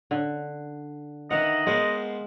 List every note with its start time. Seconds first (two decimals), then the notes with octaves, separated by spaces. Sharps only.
0.11 D3
1.31 D#3 E3 D#4 D#5 F#5
1.67 G#3 A#3 B3 C5